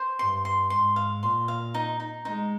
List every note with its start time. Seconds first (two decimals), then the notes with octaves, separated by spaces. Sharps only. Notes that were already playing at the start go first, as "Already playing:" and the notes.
Already playing: C5
0.19 G2 C6
0.45 C6
0.70 G#2 C6
0.96 F5
1.23 A#2 C6
1.48 F5
1.74 D#4
2.00 D#4
2.25 G#3 D#4